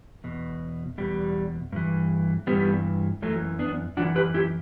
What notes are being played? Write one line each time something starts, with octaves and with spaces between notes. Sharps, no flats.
E2 B2
E2 B2 G3
G2 E3
G2 E3 G3 B3
F#2 E3 F#3 A3
B3 D4
F#2 E3 D4 F#4
G4 B4
E4 G4